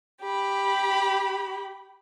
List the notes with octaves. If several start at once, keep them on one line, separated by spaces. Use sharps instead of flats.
G4 B5